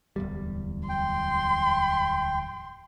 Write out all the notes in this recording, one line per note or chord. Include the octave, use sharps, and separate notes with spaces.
D1 E2 G3
G5 C6